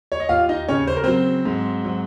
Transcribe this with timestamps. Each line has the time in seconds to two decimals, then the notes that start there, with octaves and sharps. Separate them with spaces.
0.12 C#5
0.20 D#5
0.29 D#2 F4 F5
0.49 D#4 D#5
0.68 C#3 C#4 C#5
0.87 C5
0.96 A#4
1.04 F#3 C4 C5
1.45 G#2
1.85 F#3